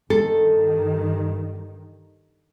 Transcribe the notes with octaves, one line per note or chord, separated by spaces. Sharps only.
G2 D#3 A4